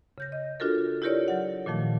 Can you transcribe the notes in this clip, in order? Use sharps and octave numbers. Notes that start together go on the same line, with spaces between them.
C#3 G6 A#6
D#5
D4 F4 F#4 A4 A#4
E4 F4 G4 A#4 C#5 D5
F#3 F#5
A#2 D#3 F3 A3